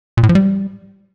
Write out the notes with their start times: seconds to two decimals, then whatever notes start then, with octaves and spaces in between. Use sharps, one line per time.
0.17 A#2
0.23 A2
0.29 F3
0.35 G3